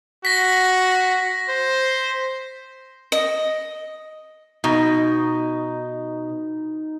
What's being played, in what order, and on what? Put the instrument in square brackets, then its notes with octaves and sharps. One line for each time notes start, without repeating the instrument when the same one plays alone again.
[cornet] F#4 [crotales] A#6 B6
[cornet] C5
[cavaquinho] D#5
[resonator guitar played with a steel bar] B2 [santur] D#4